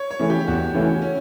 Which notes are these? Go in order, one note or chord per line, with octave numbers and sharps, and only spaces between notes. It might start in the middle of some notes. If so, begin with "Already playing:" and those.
Already playing: C#5
C#5
C#3 E3 A3 C#4
G4
E2 F#4
C#3 E3 A3 C#4
C#4